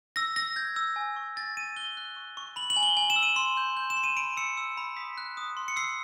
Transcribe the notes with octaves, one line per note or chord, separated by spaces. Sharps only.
E6 A#6
E6 A#6
G6 G#6
E6
G#5
C#6
G#5 A6
G#5 D#7
F#6 G7
F#6
C#6
C#6
B5 F#7
F#7
G#5
G7
G#5 F#7
E7
E6
D#7
C6
G6
G6
E7
C6
D#7
B5 D7
E6 C#7
E6
B5
D#6 B6
F#6
D#6
C6
C#7
E6 C7